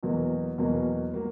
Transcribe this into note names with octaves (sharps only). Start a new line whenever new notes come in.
E2 B2 F#3 A#3
E2 B2 F#3 A#3
F#3 A#3